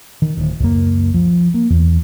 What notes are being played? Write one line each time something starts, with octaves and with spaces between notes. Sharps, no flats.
D#3
D1
C#2 F#2 A#3
F3
A#3
E2